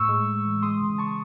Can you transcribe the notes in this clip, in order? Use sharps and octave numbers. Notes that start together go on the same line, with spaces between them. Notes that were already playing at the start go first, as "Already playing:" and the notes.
Already playing: A2 C#6 E6
G#3
A2
E3
G#3 C6 D#6
C#3
A5 C#6